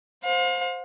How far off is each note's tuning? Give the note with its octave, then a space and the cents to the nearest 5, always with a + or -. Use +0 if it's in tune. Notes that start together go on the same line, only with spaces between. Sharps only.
C5 +0 F5 +40